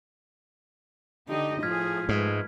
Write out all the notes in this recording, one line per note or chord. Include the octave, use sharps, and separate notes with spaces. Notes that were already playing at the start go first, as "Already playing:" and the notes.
D3 D#4 G4 D#5
A2 F3 G#4 F6 G#6 B6
G#2 G#3 A3 B4